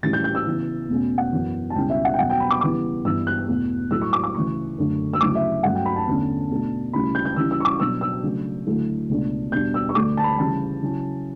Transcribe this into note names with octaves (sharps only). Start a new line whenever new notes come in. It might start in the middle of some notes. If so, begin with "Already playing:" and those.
A2 E3 G3 C#4 E4 A6
G6
G6
E6
C#3 E3 B3 E4
E2 B2 A3 C#4
F#5
F#2 E3 B3
A5
C#2 B2 G3 C#4 E4 G5
E5
F#5
G5
E2 B2 F#3 B3 F#5
G5
B5
D6
C#3 E3 G3 B3 E4 D6
G2 E3 B3 E4 E6
F#6
E2 B2 A3
A2 F#3 A3 E4 E6
C#6
D6
D6
D2 C#3 E3 C#6
F#2 D3 A3 D4
E6
D2 C#3 F#3 C#4 E4 D6
E5
G2 F#3 A3 C#4 F#5
G5
B5
A5
E2 D3 A3 C#4
B2 A3 D4
D2 C#3 G3 C#4 E4 B5
G6
G6
C#3 E3 G3 C#4 E4 E6
E6
C#6
D6
B2 F#3 B3 D4 E6
E6
C#3 F#3 A3 D4
D2 D3 F#3 A3 E4
C#2 B2 A3 D4
E2 B2 G3 D4 G6
E6
C#6
D2 D3 A3 D4 D6
A5
B5
D2 C#3 E3 G3 A5
C#3 F#3 C#4 E4